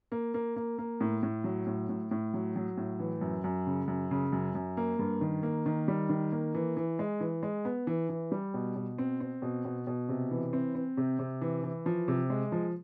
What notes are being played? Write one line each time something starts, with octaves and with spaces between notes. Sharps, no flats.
A#3
A#3
A#3
A#3
A2
A2
F#3
A2
A2
A2
F#3
F#3
A2
E3
F#2
F#2
C#3
F#2
C#3
F#2
F#2
A#3
G2
D#3
A#3
D#3
G3
D#3
A#3
E3
E3
G#3
E3
G#3
B3
E3
E3
G3
B2
B2
C4
C4
B2
B2
B2
C3
E3
C4
C4
C3
C3
E3
E3
F3
C3
G#3
F3